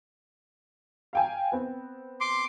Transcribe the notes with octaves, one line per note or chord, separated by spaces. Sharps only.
F5 G5 G#5
B3 C4
C6 D6